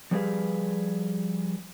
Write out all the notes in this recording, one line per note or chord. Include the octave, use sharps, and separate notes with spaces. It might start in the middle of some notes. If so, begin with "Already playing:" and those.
F3 G3 G4 G#4 B4 F5